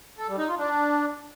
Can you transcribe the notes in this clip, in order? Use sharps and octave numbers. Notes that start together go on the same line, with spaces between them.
A4
G3
D#4
F4
D4